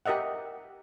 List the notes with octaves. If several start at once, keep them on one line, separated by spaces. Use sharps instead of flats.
G4 A#4 D#5 E5 F#5